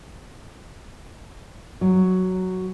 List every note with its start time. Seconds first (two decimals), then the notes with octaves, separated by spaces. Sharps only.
1.81 F#3